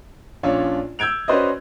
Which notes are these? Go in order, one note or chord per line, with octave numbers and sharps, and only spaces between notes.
A#1 C#4 D4 F4 C#5
E6 G6 G#6 D7 F7
C#4 F#4 B4 C5 D5 D#5